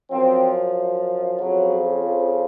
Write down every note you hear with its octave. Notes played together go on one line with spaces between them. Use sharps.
F#2 F3 C4
F2 C#3 F3 F#3